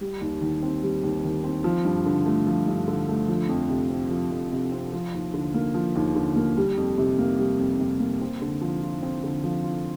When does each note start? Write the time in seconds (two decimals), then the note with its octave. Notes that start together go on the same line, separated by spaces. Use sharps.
0.01 G3
0.21 D#2
0.41 D#3
0.63 C4
0.83 G3
1.03 D#2
1.24 D#3
1.44 C4
1.64 F3
1.85 G2
2.06 D3
2.26 A3
2.47 F3
2.68 G2
2.88 D3
3.09 A3
3.28 F3
3.49 F2
3.69 C3
3.90 C4
4.10 F3
4.31 F2
4.52 C3
4.72 C4
4.93 F3
5.14 D#2
5.34 D3
5.54 A#3
5.74 F3
5.96 D#2
6.15 D3
6.36 A#3
6.57 G3
6.77 F2
6.98 C3
7.19 A#3
7.39 G3
7.59 F2
7.79 C3
8.00 A#3
8.21 C4
8.42 D3
8.61 F3
8.83 F4
9.02 C4
9.24 D3
9.44 F3
9.64 F4